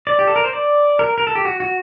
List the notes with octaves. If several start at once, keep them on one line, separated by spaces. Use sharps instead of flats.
D5
G4
A4
A#4
C5
D5
A#4
A#4
A4
G4
F#4
F#4